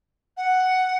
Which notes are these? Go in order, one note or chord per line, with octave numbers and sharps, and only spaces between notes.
F#5